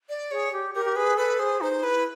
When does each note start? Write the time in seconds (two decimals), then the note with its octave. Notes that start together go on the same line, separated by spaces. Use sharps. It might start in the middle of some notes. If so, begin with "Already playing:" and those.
0.09 D5
0.31 G#4 C#5
0.52 G4
0.75 G4 A#4
0.85 G4
0.96 G#4 B4
1.18 A4 B4
1.39 G#4 C5
1.61 D#4 C5
1.83 E4 B4